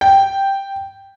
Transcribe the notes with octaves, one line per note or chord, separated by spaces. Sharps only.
G5